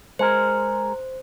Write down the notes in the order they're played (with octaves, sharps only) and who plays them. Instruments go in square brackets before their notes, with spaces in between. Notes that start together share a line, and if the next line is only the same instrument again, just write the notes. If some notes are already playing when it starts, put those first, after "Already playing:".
[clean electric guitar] G#3 G#4 A#4 [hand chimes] C5